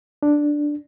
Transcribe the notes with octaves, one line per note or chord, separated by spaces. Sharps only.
D4